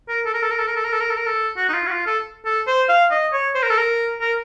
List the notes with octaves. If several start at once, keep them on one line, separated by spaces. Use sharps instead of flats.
A#4
A4
A#4
A4
A#4
A4
A#4
A4
A#4
A4
A#4
A4
A#4
A4
F#4
D#4
F4
F#4
F4
A4
A4
C5
F5
D#5
C#5
C5
A#4
A4
A#4
A#4